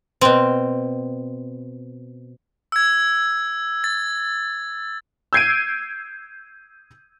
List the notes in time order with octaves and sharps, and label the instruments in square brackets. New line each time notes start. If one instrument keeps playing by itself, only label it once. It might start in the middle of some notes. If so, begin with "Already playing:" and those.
[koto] B2 C4
[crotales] E6 G#6
A6
[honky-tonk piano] E6 G6 G#6 C7 D7 D#7